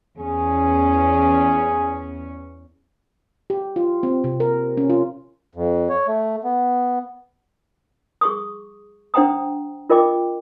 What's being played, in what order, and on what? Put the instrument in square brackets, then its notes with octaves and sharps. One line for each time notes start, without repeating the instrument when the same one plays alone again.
[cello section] E2 C#4 [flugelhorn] G#4
[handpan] G4
F4
C4
C3
A#4
C#4
F4
[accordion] F2
C#5
A3
B3
[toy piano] G#4 C#6 D#6
D4 C5 F#5 G5 A#5 D#6
F4 A#4 D#5 G5 D6